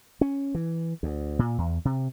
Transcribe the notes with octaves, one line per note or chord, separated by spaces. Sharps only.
C#4
E3
D2
A#2
E2
C3